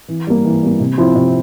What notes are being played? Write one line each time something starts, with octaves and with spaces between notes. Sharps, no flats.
E3
G3 A#3
E3
G3 A#3
C3
F3 C4 E4
C3